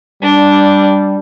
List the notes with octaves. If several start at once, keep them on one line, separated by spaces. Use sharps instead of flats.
G3 D4